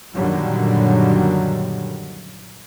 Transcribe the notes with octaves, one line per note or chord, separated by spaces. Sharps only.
F#2 A#2 D3 D#3 F#3 G3